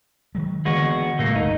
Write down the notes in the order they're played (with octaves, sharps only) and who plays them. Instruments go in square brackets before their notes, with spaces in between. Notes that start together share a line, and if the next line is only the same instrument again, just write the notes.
[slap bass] D#3 F#3 G#3
[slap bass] D3 E3 A#3 [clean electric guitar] G#3 B3 F#4
[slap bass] A2 C3 G3 [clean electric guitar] A3 A#3
[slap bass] G1 C#2 [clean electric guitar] D#4